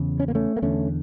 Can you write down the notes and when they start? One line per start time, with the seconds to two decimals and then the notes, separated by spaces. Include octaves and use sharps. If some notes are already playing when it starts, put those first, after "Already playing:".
Already playing: E2 C#3
0.20 C#4
0.28 A#3
0.35 A3 C#4
0.57 A#3
0.62 E2 D3 A3 C#4